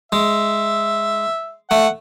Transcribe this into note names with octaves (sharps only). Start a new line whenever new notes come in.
G#3 E5
A3 F#5